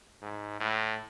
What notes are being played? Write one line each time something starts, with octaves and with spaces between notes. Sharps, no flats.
G#2
A2